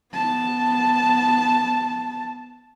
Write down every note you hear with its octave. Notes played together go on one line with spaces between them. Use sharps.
B3 A5